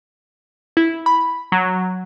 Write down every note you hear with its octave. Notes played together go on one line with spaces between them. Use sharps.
E4
B5
F#3